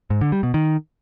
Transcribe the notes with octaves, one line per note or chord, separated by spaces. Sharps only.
G#2
D3
G3
B2
D#3